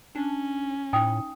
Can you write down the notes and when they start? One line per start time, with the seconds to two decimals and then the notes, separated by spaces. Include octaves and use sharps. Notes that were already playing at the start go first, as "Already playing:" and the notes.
0.15 C#4 D4
0.93 A2 D#4 G5 D#6